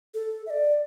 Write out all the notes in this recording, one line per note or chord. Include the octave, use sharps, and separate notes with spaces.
A4
E5
D5